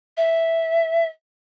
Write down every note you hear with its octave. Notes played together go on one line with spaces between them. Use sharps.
E5